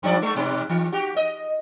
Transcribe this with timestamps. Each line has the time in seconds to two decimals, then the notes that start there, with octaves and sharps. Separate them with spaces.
0.03 F#2 F3 D5
0.22 G#3
0.36 G#2 B2
0.69 E3
0.92 F#4 G4
1.16 D#5